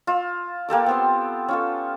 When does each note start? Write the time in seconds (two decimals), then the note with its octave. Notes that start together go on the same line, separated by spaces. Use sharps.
0.07 F4 E6
0.69 A#3 G4 A4 D6
0.86 B3 C4 C6
1.48 C#4 F4 A4